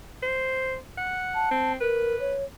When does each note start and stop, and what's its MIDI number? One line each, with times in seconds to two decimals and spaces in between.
0.23 0.76 72
0.97 1.50 78
1.35 1.72 81
1.51 1.75 60
1.80 2.19 70
1.80 2.34 71
2.20 2.45 73